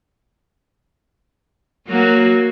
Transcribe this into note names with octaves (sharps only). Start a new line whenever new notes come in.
F#3 A#3 F#4